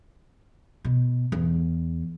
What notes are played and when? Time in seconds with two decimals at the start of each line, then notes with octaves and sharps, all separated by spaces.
0.84 B2
1.32 E2